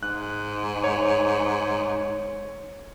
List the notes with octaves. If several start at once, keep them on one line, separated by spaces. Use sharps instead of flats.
G#2 F#6
C#5